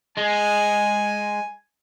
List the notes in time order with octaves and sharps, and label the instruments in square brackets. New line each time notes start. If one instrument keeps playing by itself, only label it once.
[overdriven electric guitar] G#3 [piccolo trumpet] G#5